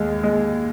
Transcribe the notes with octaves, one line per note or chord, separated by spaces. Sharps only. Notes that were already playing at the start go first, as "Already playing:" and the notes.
Already playing: D#2 G#3
G#3